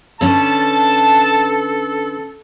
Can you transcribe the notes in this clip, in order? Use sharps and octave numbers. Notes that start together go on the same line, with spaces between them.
D3 C#4 A4 B4 A5